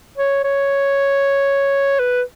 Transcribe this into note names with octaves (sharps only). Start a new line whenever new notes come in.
C#5
C#5
B4